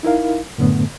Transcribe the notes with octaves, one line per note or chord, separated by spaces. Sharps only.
D#4 E4 A#4 F5
F#2 A2 D3 A3 B3